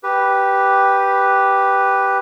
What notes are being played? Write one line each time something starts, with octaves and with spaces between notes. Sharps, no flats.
G4 B4